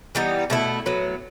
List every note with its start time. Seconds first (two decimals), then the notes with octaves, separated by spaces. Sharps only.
0.15 E3 G3 B3 D#4
0.50 B2 A3 E4
0.86 A2 F#3 B3